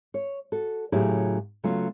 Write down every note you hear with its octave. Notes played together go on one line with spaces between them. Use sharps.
C#5
F#4 A4
A2 C#3 F#3 E4 G4 G#4
C#3 F#3 A3 B3 F4